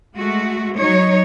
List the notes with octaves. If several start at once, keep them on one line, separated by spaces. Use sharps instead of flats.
G#3 A3 F#4
F#3 D#4 C#5